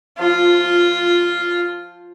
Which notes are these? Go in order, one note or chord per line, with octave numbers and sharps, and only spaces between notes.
F3 F4